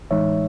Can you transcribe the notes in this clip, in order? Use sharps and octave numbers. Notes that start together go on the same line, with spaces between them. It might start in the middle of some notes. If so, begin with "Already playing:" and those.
A2 E3 G#3 D#4 C#5 E5